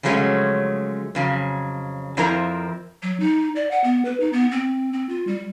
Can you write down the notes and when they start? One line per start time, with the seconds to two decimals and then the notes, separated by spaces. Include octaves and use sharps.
0.03 C#3 F3 F#3 G#3 A3 C#4
1.15 F2 C#3 F#3
2.17 F2 F3 C4 E4 A#4 A#5
3.03 F#3
3.20 D#4
3.56 D5
3.71 F#5
3.84 B3
4.05 B4
4.20 D#4
4.33 B3
4.51 C4
4.93 C4
5.09 F4
5.27 G3